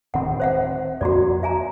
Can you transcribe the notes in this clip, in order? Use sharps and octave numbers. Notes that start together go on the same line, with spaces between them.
D1 D#3 C4 F#5
C5 E5 F#5
F2 A#3 F#4 D5
E5 G#5 A#5